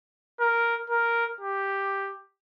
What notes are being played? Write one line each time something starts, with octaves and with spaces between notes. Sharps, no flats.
A#4
A#4
G4